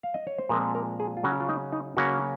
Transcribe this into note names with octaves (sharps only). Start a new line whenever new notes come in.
F5
D#5
C#5
C5
A#2 F3 G#3 C4 A#4
A#4
G#4
F4
C#3 F#3 C#4 F#4
F4
D#4
D#4
C#3 F#3 A#3 C#4 F#4